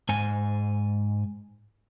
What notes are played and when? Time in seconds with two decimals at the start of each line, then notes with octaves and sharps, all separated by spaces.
0.09 G#2 G#5